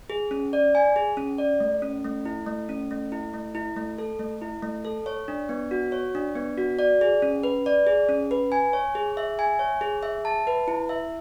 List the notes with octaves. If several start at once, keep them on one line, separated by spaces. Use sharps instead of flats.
G#4
C#4
D5
G#5
G#4
C#4
D5
A3
C#4
A3
E4
A3
C#4
A3
E4
A3
E4
A3
A4
A3
E4
A3
A4
C#5
D4
B3
F#4
C#5
D4
B3
F#4
D5
G#4
C#4
B4
D5
G#4
C#4
B4
G#5
C#5
G#4
E5
G#5
C#5
G#4
E5
A5
B4
E4
E5